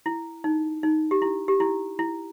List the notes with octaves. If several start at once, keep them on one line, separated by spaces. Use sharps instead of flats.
E4
D#4
D#4
G4
E4
G4
E4
E4